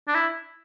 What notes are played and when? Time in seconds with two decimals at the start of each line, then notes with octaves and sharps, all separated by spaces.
0.08 D4
0.15 E4